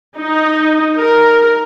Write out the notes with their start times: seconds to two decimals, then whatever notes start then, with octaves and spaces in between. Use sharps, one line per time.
0.18 D#4
0.99 A#4